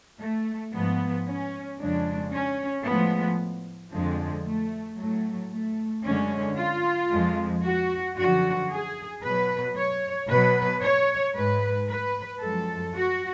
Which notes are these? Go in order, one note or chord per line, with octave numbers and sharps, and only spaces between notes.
A3
G#2 F3 G#3 B3
C#4
F2 C#3 G#3 D4
C#4
A2 F3 G#3 B3
F2 D3 F3 G#3
A3
A2 F#3 A3
A3
F#2 D3 G#3 C#4
F4
F2 F3 G#3
F#4
F#2 D3 F3 F#4
G#4
B2 F#3 B4
C#5
B2 B4
F#3
C#5
G#2 G#3 B4
B4
F#2 F3 G#3 A4
F#4